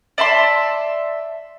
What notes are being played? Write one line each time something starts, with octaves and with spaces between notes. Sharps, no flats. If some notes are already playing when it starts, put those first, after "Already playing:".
D5 E5 A5 C6